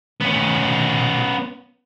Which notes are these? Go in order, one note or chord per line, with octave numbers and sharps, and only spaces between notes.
B3 C#4